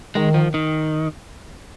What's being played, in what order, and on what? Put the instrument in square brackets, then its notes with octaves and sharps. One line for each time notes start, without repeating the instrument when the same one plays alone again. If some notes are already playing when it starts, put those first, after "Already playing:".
[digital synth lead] D#3 [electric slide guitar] G#3
[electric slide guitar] F3
D#3